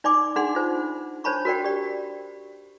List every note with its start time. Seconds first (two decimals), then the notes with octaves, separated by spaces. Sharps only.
0.04 D#4 D5 G#5 C6 D6
0.36 D4 D#4 G#4 F#5 C6
0.55 D#4 F4 C5
1.24 D4 C5 C#5 A5 B5 C#6
1.45 F#4 A#4 D5 G5
1.64 G4 D5